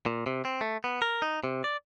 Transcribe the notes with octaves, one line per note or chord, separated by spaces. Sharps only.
A#2
C3
C4
A3
B3
A#4
D#4
C3
D5